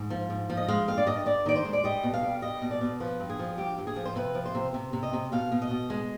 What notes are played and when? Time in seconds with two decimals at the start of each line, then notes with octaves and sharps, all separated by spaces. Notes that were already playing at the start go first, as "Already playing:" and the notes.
Already playing: G#2
0.10 F3
0.30 G#2
0.50 F3
0.57 D#5
0.68 G#3 F5
0.88 G2 F5
0.98 D5
1.07 G2 D#5
1.26 G2 D5
1.46 D#3 D5
1.55 C5
1.65 G#3
1.73 D5
1.84 G3 D#5
2.04 B2
2.14 F5
2.23 G3
2.42 G3 D#5
2.62 B2
2.71 D5
2.81 B2
3.00 F3 B4
3.20 G2
3.30 G#4
3.39 F3
3.58 G2 G4
3.78 G2
3.87 G#4
3.96 F3
4.05 C5
4.16 C3 B4
4.35 F3
4.46 C5
4.55 C3
4.74 C3
4.93 C3
5.03 D#5
5.13 C3
5.32 B2 F5
5.52 B2
5.62 D#5
5.71 B2
5.90 G#3